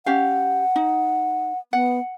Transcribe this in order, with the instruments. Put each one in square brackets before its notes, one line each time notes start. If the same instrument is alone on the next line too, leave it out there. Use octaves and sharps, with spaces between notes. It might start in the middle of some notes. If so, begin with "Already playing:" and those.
[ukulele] C#4 G4 F5 [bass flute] F#5
[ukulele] D#4
[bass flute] B3 [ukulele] F#5